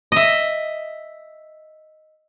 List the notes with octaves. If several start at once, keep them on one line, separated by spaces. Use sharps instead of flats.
D#5 E5